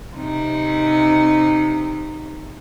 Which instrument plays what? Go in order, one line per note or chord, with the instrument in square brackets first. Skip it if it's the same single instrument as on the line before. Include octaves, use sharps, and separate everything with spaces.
[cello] C3 D#4